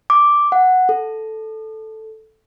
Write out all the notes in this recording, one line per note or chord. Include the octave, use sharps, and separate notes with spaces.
D6
F#5
A4